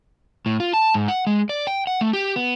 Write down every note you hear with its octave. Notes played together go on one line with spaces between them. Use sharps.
A2
F4
A5
G#2
F#5
G#3
D5
G5
F#5
A3
G4
B3